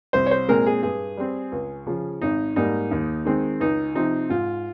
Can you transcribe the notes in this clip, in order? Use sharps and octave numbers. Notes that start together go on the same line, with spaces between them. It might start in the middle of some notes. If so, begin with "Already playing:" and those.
C2 C5
C#5
C5
A#2 G#3 C4 A#4
G#4
G2 G#4
G3 C4
C#2
C#3 F3
G#1 D#4
G#2 G3 A#3 D#4
D#2
D#3 G#3 C4
C#2 D#4
C3 F3 C4 D#4
G#2 F4